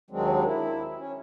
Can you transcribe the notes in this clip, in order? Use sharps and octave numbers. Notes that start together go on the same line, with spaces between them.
D#2 D#3 F#3 G#3 C4 D4
E4
C#4